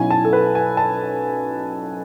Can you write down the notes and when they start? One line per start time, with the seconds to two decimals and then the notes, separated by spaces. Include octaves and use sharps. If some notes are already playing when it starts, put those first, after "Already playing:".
Already playing: B1 B2 F#3 C#4 E4 G#5
0.11 A5
0.25 A4
0.33 B4
0.55 G#5
0.77 A5